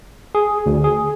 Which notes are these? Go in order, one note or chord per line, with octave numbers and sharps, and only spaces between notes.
G#4
D2
G#4